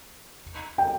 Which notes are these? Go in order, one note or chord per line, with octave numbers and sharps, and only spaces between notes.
G5